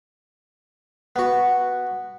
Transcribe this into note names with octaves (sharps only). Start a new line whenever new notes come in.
B3 F#4